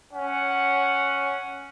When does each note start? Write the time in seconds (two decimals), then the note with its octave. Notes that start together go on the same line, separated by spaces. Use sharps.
0.14 C#4 F#5